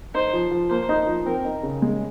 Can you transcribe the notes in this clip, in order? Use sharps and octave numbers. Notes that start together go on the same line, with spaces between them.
D#4 C5
F3
F3
A#3 C5
D#4
F3
C4 A#4
D#4
C#3
G#3